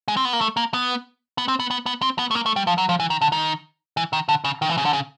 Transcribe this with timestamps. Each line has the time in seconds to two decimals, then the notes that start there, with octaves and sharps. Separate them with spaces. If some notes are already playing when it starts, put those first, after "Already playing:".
0.08 G#3
0.17 C4
0.25 B3
0.33 A#3
0.41 A3
0.57 A#3
0.74 B3
1.38 B3
1.48 C4
1.60 B3
1.71 B3
1.86 B3
2.02 C4
2.19 B3
2.31 A3
2.35 A#3
2.46 A3
2.56 G3
2.67 F3
2.78 F#3
2.89 F3
3.00 E3
3.10 D#3
3.21 D3
3.32 D#3
3.97 E3
4.13 D#3
4.29 D3
4.44 C#3
4.62 D#3
4.69 E3
4.78 C#3
4.85 D3
4.93 C#3